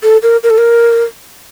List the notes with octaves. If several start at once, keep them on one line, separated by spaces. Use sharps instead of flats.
A4
A#4
A#4
A4
A#4